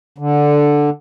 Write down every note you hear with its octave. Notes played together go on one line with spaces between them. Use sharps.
D3